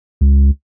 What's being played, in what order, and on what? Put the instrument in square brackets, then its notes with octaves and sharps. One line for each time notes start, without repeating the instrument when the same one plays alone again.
[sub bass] C#2